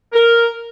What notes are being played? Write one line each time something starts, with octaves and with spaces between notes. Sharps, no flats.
A#4